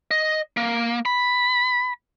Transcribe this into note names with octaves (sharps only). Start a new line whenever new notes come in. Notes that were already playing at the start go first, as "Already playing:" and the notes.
D#5
A#3
B5